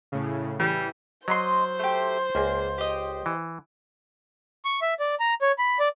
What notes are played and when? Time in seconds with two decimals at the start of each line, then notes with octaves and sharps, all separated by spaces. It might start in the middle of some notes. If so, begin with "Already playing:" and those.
0.12 A2 C#3
0.59 E3 G3
1.28 F#3 C5 D#5 B5 C6
1.79 A3 G4
2.35 C#2 A#3 G#4
2.78 G4 D#5
3.26 E3
4.65 C#6
4.82 E5
5.00 D5
5.20 A#5
5.41 C#5
5.58 B5
5.79 D5